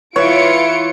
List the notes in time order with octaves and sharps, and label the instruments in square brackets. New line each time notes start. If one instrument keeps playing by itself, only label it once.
[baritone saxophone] E3 [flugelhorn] E4 [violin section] F4 C#7 D7 [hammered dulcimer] C#5